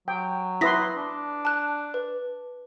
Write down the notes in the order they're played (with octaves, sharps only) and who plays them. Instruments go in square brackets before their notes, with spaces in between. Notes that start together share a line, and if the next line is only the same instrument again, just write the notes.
[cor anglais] F#3 [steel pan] G5
[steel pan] E4 B4 C6 [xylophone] D#6 A#6 B6
[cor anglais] D4
[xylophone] A5 F#6
B4